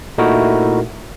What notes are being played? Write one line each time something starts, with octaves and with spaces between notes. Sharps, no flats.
A#2 A3 D#4 E4 F#4 A#4